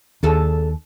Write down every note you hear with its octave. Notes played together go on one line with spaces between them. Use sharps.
D#2 D4 G#4 A4